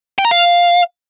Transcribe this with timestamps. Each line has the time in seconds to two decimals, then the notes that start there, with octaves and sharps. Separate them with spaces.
0.18 G5
0.25 A#5
0.31 F5